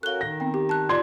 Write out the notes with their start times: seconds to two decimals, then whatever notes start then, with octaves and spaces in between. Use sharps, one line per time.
0.03 C#4 F#4 A4 A#4 F5 F#6 G7
0.21 D#3 A#6
0.40 B3 C4 G5
0.54 G4
0.69 A5 F#6
0.89 D#4 F4 D5 C6 G#6